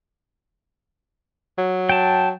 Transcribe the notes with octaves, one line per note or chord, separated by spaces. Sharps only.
F#3
G5 A5